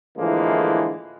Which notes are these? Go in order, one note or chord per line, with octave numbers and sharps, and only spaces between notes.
A2 D3 E3 F3 G#3 A#3